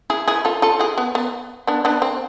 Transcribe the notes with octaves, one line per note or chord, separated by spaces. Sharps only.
E4 G#4
E4 G#4
F4 A4
F4 A4
E4 G#4
B3
B3
B3 D4
B3 D4
C4